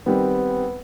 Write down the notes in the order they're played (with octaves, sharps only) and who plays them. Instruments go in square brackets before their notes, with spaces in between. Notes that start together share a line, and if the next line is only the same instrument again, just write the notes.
[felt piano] D#3 G3 C4 [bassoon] B3